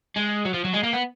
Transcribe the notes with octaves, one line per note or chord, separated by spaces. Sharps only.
G#3
F#3
F3
F#3
G#3
A#3
B3